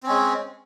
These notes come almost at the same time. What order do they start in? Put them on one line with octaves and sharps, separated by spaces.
C4 C#4 G#3